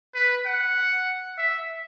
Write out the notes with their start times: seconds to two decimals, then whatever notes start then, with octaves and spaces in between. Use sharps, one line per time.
0.15 B4
0.46 F#5
1.38 E5